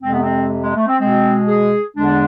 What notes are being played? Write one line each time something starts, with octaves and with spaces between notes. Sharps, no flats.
F2 C3 G#3 C4
B3
C4
G#3
A3
C4
B2 G#3 C4
G#4
E2 D3 G#3 D4